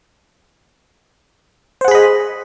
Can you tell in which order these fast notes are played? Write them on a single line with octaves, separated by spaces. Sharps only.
C5 F#5 G#4 B5 D#5